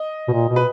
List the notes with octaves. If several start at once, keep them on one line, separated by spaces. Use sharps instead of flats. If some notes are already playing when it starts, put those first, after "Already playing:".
Already playing: D#5
B2
A#2
B2
B4